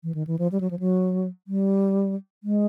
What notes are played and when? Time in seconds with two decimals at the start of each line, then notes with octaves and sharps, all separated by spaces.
0.03 E3
0.15 D#3
0.27 E3
0.39 F3
0.52 G3
0.61 F#3
0.71 F3
0.79 F#3
1.48 G3
2.44 G#3